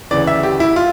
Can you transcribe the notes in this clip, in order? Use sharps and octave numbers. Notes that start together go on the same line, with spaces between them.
D2 C#3 E3 D5
E5
G4
E4
F4